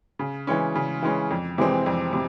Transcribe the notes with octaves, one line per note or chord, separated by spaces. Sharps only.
C#3
E3 G#3 C#4
C#3
E3 G#3 C#4
F2
C3 E3 G#3 C4
F2
C3